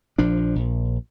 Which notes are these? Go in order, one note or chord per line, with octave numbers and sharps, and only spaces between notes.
A#1 F3 D4
A#1